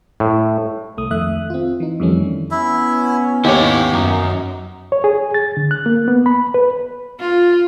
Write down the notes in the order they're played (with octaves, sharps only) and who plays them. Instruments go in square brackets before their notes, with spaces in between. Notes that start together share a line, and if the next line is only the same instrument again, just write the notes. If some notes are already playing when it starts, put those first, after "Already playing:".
[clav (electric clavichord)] A2
[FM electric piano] C2 A3 D#6
F2 D#3 A3 E5 D#6 F#6
C4 F4
E3 D#4
F2 D#3 E3 G3 A3 C#4
[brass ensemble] B3 C#4 [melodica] E4 E5
[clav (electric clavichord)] D#2 [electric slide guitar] E4 C#5 [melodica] G4
[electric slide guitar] F#2 [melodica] D#4
[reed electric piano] C#5
G#4
A6
D3
F#6
A#3
B3
B5
B4
[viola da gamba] F4